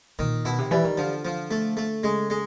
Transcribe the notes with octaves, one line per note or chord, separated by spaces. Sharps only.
A#2 D#3
B2 E4
C3
E3 G3
D#3
D3 F3
F3
A3
A3
C#3 G#3
G#3